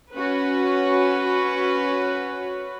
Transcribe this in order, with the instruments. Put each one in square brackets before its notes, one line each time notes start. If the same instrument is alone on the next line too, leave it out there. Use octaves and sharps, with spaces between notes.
[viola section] C#4 F#4 B4